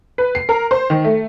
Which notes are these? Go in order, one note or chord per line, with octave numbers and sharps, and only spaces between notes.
B4
C7
A#4
C5
D#3
A3